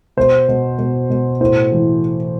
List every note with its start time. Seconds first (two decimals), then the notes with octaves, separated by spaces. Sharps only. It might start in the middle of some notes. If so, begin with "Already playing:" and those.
0.17 B2 C5
0.48 B2
0.78 B2
1.10 B2
1.41 A2 C5
1.72 E3